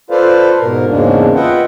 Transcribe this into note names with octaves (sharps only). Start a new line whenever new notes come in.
F4 A4 B4 C5 D5 F5
G#2 B2 A#4
E2 G#2 C#3 G#3 A#3 D4
F4 B4 D#5 E5 F#5 G5